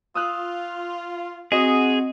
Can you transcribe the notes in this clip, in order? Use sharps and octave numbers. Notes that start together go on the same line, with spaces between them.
F4 D#6 E6 F#6
C4 F#4 G#4 D#5